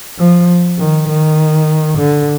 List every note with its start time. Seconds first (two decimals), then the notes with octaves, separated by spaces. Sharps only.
0.18 F3
0.78 D#3
1.08 D#3
1.98 D3